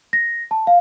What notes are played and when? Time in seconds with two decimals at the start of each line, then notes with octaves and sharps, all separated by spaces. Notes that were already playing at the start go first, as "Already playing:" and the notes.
0.13 A#6
0.51 A5
0.67 F5